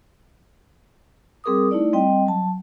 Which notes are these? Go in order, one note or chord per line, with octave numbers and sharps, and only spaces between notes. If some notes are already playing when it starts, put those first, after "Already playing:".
G3 C4 G#4 A#4 D6 D#6
A3 D#4 E4 D5
G3 C4 D#5 G5
F#3 A5